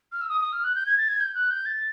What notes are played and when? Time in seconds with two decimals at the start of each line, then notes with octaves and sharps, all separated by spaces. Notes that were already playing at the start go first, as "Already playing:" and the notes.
0.12 F6
0.21 E6
0.29 D#6
0.41 D#6
0.52 F6
0.64 F#6
0.75 G6
0.86 G#6
0.98 A6
1.09 G#6
1.20 G6
1.35 F#6
1.51 G6
1.66 A6